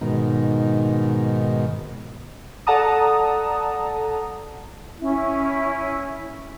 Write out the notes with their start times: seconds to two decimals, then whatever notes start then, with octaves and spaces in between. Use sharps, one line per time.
0.01 G#2 B2 D#3
2.67 A4 D5 F#5 A5 A#5 D#6
5.00 C#4 E4